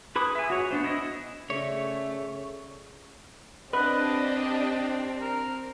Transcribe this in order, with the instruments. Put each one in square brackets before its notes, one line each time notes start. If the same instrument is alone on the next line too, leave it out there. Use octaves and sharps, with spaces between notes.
[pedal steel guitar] G#4 B4 B5 D6 D#6
E5 G#5
F#4 C#5
B3 D4 C5
E4 D#5
[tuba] C#3 [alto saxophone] A3 [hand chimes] G#4 D5 B6 [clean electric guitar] C#5
[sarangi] C4 [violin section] D4 G4 [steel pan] B4 [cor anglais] D#5
[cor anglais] A#4